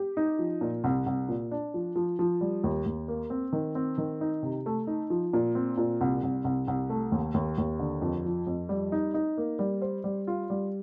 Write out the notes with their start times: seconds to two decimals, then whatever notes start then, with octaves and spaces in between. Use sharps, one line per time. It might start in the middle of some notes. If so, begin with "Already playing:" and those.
Already playing: G4
0.17 D#4
0.39 F3
0.61 A#2
0.84 C2
1.06 C2
1.29 A#2
1.51 D4
1.74 F3
1.96 F3
2.19 F3
2.41 G3
2.64 D#2
2.86 D#2
3.08 A#3
3.30 C4
3.53 D#3
3.75 C4
3.98 D#3
4.21 D#4
4.43 C3
4.66 A3
4.87 D#4
5.10 F3
5.33 A#2
5.55 C4
5.77 A#2
6.01 C2
6.23 C2
6.44 C2
6.68 C2
6.90 A3
7.12 D#2
7.34 D#2
7.58 D#2
7.79 D3
8.02 F2
8.25 F3
8.47 F2
8.69 G3
8.92 D#4
9.14 D#4
9.37 A#3
9.59 G3
9.82 C5
10.04 G3
10.27 F4
10.50 G3